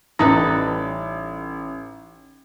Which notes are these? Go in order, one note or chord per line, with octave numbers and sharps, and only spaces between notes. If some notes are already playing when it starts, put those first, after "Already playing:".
A1 G3 C#4 D#4 A4 B4